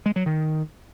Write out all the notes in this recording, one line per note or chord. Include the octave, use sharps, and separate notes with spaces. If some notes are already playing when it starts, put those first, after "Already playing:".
G#3
F#3
D#3